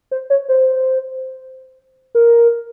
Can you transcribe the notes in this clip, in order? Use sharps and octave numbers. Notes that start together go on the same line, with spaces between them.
C5
C#5
C5
A#4